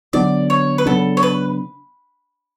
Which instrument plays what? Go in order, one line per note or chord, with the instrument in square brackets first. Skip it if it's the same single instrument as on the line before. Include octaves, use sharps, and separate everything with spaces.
[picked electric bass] D3 F#3 B3 D4 [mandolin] D5
[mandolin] C#5
B4
[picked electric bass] C#3 F#3 B3 D4 [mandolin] A4
[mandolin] C#5
B4